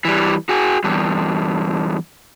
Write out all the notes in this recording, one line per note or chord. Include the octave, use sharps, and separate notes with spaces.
E3 G3
F#4 G#4
E2 G2